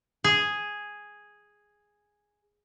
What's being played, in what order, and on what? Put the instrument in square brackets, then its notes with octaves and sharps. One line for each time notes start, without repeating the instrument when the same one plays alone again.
[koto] G#4 G#5